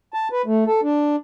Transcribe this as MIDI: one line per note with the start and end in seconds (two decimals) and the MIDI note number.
0.14 0.28 81
0.32 0.42 71
0.46 0.64 57
0.67 0.81 69
0.83 1.16 62